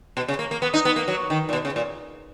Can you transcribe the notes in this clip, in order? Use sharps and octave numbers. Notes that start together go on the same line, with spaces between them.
B2
C#3
A#3
A#3
B3
D#4
B3
A#3
F#3
D#3
A#2
B2
C#3
A#2